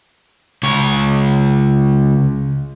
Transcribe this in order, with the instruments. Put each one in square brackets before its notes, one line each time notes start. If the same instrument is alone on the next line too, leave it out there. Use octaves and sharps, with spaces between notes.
[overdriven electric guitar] C#2 C#5